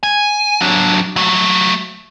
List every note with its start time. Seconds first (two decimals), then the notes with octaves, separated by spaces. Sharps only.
0.03 G#5
0.61 F#3 D4
1.16 F#3 A3